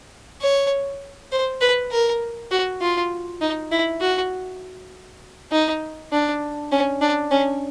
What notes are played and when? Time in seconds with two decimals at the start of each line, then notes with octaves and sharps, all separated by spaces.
0.41 C#5
1.31 C5
1.61 B4
1.92 A#4
2.51 F#4
2.81 F4
3.41 D#4
3.72 E4
4.01 F#4
5.52 D#4
6.12 D4
6.71 C#4
7.01 D4
7.31 C#4